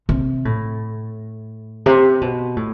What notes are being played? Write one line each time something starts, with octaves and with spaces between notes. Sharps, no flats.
C3
A2
C3
B2
A2